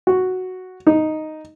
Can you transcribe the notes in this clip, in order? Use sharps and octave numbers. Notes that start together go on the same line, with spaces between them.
F#4
D#4